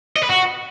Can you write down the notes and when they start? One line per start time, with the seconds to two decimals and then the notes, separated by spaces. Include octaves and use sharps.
0.16 D#5
0.23 B4
0.29 F#4